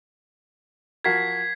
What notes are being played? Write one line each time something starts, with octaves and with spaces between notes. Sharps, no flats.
F3 F#4 A#4 G#6 B6 C7